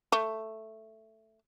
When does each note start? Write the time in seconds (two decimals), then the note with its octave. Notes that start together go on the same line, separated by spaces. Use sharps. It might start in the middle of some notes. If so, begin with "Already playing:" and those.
0.12 A3